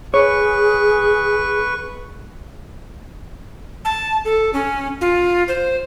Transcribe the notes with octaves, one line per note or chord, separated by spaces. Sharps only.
G#4 B4 C#5 C#6
A5
A4
C#4
F4
C5